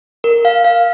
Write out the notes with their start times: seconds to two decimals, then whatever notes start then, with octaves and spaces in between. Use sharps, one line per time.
0.24 A#4
0.45 F5
0.64 F5